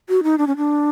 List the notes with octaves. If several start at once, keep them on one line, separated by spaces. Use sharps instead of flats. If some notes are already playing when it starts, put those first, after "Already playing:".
F#4
D#4
D4
C#4
D4